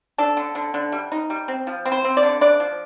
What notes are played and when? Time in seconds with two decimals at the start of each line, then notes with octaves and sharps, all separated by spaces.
0.18 D4 A4
0.37 D3
0.55 D3
0.74 D3
0.92 G3
1.12 D#4
1.30 G3
1.48 C4
1.67 F3
1.86 C4
1.92 C5
2.04 C4
2.17 D5
2.23 D3
2.41 D4 D5
2.60 F3